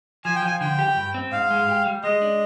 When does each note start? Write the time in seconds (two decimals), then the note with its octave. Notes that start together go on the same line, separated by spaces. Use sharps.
0.25 F3 G#5
0.36 G5
0.43 F3 G#5
0.61 D3 G5
0.79 G4
0.96 G2
1.14 C4
1.32 G#2 F5
1.51 G#3
1.68 G4
1.85 G3
2.04 G#3 D#5
2.22 D4